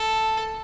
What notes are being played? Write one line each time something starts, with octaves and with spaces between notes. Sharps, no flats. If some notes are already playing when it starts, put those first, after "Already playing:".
Already playing: A4